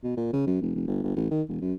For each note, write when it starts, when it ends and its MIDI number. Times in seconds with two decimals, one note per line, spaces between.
0.04 0.17 47
0.17 0.29 46
0.33 0.42 49
0.47 0.61 42
0.62 0.73 29
0.75 0.83 29
0.87 1.01 31
1.04 1.14 31
1.16 1.29 33
1.31 1.42 51
1.49 1.59 28
1.62 1.73 42